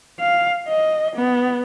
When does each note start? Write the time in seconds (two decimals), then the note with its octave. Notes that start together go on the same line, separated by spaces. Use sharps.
0.20 F5
0.68 D#5
1.16 B3